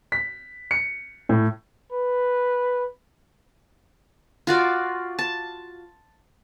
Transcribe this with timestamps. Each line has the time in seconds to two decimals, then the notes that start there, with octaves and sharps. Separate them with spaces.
0.12 B6
0.71 C#7
1.29 A2
1.92 B4
4.47 F4 F#4 D5
5.19 A5